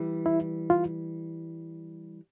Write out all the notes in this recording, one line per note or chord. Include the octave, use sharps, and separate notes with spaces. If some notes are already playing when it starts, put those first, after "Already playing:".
Already playing: E3 G3
E4
F4